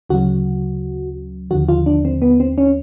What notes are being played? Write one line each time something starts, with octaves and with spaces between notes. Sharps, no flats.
D2 C#3 F#3 F#4
D#2 D3 F3 F#4
F4
D4
C4
B3
C4
C#4